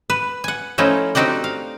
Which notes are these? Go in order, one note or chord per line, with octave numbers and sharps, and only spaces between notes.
B4
F#5 G#5
F3 A3 C#4 D#4 E4
C4 D4 D#4 F#4 G4 D5
F5